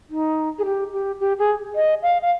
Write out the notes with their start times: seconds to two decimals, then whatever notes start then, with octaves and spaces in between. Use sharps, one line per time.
0.10 D#4
0.59 G#4
0.65 G4
0.93 G4
1.20 G4
1.39 G#4
1.75 D#5
2.02 F5
2.22 F5